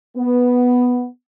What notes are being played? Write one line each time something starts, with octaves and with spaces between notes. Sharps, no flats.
B3